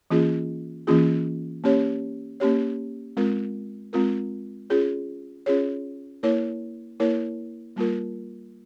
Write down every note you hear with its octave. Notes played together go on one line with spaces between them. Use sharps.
E3 A#3 C#4 F4 G#4
E3 A#3 C#4 F4 G#4
A#3 C#4 G4 C#5
A#3 C#4 G4 C#5
G#3 C4 F4 A#4
G#3 C4 F4 A#4
C#4 F4 G#4 C#5
C#4 F4 G#4 C#5
A#3 E4 A#4 C#5
A#3 E4 A#4 C#5
G3 A#3 F4 A#4